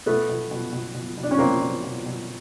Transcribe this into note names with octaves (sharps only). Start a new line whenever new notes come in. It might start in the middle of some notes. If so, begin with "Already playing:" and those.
B2 A3 B3
B2
B2
B2
B2
B2
D4
C#4
B2 A#3 C4
B2
B2
B2